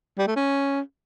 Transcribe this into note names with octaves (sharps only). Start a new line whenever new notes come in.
G3
A3
C#4